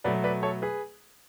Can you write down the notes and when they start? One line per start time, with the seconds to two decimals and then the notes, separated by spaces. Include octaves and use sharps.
0.04 B2 F#3 A3 B4 D5
0.24 B4 D5
0.43 A4 C#5
0.62 G#4 B4